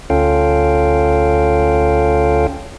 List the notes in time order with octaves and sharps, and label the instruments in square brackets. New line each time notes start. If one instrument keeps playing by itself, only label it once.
[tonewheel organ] D2 C#4 F4 A4 F5 G5